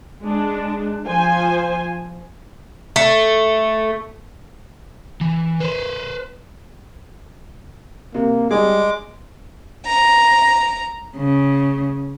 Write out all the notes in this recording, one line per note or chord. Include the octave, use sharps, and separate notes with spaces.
G#3 D4
F3 C5 G#5
A3
E3
B4 C5
C3 A#3
G3 G#3 D4 G#4 D6
A#5
C#3